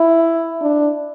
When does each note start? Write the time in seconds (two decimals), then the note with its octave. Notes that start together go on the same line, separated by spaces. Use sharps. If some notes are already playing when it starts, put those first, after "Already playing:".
Already playing: E4
0.61 D4